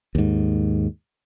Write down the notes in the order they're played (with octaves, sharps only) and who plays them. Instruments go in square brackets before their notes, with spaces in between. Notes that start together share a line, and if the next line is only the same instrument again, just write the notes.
[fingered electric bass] D#2 G#2